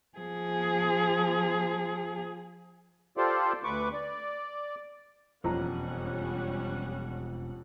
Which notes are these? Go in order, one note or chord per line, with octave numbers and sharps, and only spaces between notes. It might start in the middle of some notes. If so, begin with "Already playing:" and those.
F3 G#4
F4 G4 A4 C5 D5
D2 B4 C#6 D6
D5
E1 F2 G3 A#3 C#4 F#5 A#5